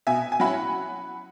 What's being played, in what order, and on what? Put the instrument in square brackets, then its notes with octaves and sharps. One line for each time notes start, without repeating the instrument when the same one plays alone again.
[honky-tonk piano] B2 E5 G#5
G#5
F#3 C#4 E4 F#5 B5